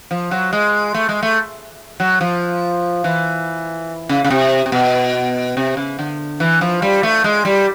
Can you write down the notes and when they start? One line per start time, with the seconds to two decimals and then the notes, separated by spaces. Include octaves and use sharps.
0.11 F3
0.31 F#3
0.53 G#3
0.94 A3
1.09 G#3
1.23 A3
2.00 F#3
2.21 F3
3.04 E3
4.09 C#3
4.24 C#3
4.30 C3
4.66 C3
4.72 B2
5.57 C3
5.77 C#3
5.99 D3
6.40 E3
6.61 F3
6.82 G3
7.03 A3
7.24 G#3
7.45 G3